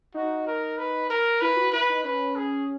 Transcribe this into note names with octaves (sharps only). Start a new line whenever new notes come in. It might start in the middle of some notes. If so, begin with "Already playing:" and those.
D#4 F#4
A#4
B4
A#4
E4 B4
F#4
E4 B4
D#4
C#4 B4
G#4